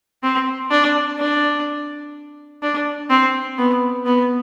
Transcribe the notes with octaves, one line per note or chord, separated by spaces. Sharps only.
C4
D4
D4
D4
C4
B3
B3